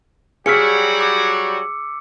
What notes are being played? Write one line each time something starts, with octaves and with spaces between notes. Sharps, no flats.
F#3 G3 F#4 G#4 E6 F6 B6 C#7
D6